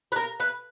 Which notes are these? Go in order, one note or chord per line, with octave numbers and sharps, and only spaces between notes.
B4
A#4
B4